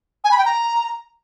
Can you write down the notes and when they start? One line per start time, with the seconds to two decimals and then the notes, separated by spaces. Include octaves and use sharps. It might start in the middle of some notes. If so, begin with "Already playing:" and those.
0.24 G#5
0.31 B5
0.38 G5
0.45 A#5